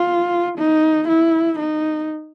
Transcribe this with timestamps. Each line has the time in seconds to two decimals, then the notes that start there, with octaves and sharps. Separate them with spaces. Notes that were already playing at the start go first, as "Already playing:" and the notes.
Already playing: F4
0.57 D#4
1.08 E4
1.59 D#4